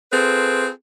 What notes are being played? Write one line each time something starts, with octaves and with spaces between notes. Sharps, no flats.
C4 F4 G#4 A4 B4